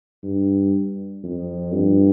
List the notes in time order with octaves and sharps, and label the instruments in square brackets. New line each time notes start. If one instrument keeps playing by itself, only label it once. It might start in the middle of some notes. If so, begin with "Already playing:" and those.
[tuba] G2
F2
G2